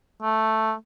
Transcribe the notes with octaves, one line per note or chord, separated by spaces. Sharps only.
A3